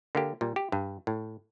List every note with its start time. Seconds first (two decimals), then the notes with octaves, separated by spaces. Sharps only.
0.15 D3 A#3 G4
0.41 A#2 G3
0.56 G4
0.72 G2
1.07 A2